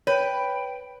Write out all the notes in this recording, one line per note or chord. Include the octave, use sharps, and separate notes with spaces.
B4 C#5 G5